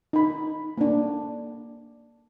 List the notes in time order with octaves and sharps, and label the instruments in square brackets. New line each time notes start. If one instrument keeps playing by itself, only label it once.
[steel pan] D#4 B5
A#3 D4